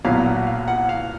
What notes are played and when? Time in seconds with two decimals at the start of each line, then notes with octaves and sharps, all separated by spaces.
0.04 B1 A#2 F#3 B3 F5
0.26 F#5
0.47 F5
0.68 F#5
0.89 F5